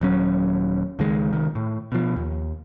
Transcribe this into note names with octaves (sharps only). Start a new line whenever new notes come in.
D#1 F#3 C#4
C#2 D#3 G#3
C2 D#3
A2
B2 F3
D#2